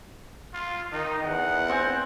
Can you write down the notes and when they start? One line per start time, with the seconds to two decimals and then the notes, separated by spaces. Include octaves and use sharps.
0.54 F4
0.92 D#3 D#4
1.24 E2 F#5
1.69 C4 G5 G#5